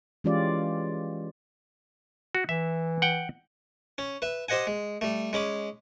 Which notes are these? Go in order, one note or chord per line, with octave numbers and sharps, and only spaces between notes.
E3 G#3 C#4 F4 G4 D5
F#4
E3 E5
F#5 G5
C#4
B4 E5
G4 C5 D#5 F#5 G#5
G#3
G3 A3
G#3 C#4 B5 D6